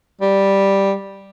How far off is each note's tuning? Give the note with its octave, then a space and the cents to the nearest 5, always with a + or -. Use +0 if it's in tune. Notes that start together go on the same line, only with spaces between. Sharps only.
G3 +0